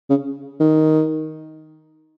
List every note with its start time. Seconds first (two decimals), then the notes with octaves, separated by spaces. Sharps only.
0.10 C#3
0.60 D#3